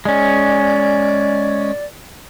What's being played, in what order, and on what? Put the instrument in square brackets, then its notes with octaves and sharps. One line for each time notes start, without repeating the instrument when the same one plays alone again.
[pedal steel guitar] G#3 C#4 [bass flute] D5